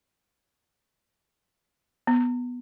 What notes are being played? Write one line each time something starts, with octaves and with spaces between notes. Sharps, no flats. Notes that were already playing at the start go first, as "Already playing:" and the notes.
B3